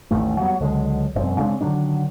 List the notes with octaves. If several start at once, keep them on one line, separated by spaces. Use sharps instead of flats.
A1 E2 D#3 A3
F#3 G3 B3
C#2 D3 F#3 G#3
E1 F#2 C4
C#3 G#3 C4 D4
D3 D#3 F#3 D4